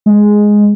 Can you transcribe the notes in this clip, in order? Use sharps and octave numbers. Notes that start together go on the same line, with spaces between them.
G#3